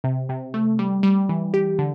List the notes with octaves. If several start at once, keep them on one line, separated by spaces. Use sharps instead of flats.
C3
C3
A3
G3
G3
E3
G4
D3